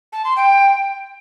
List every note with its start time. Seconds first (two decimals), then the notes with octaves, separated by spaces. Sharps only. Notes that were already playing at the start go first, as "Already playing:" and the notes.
0.12 A5
0.24 C6
0.36 G5